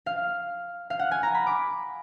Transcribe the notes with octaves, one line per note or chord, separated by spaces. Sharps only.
F5
F5
F#5
G#5
A#5
B5
D6